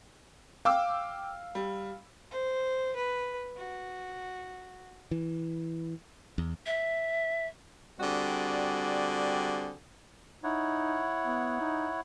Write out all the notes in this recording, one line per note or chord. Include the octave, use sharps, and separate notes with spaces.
F5 G5 D6 E6
G3
C5
B4
F#4
E3
E2
E5
D3 G3 C4 F#4 G#4 D5
D#4 E4 C#5 F#5
B3
D#4